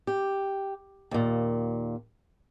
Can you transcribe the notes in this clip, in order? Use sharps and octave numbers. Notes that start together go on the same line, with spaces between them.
G4
D#2 A#2